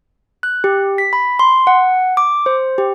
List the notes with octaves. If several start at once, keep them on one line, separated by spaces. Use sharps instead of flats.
F#6
G4
B6
B5
C6
F#5
D6
C5
G4